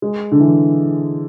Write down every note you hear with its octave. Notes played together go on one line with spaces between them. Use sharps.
G#3
D3
E3